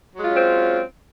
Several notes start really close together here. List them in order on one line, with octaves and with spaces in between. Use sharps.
F#3 G#3 F4 C#4 C4